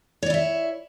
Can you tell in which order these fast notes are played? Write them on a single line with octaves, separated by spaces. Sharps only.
C#5 D5 E4 E5